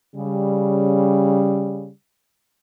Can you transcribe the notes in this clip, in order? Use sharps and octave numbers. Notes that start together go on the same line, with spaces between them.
C#3 G3